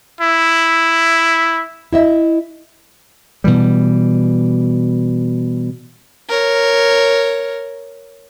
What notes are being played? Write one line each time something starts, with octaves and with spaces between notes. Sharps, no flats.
E4
E4 D#5 E5
B2 E3 G3
A#4 C#5